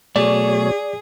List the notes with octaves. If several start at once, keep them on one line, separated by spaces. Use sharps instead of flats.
B2 F#3 A3 G#4 C#5 D5